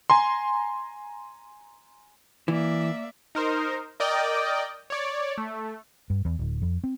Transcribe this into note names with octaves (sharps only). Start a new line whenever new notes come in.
G#5 A#5 C6
E3 A#3 D5 E5
D#4 A#4 C5
A#4 D5 D#5 G5
C#5 D5
A3
G2
E2
D1
F2
C4